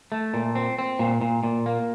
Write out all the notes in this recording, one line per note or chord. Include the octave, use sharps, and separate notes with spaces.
A3
A#2
C4
C4
A#2
A#2
A#2
A#3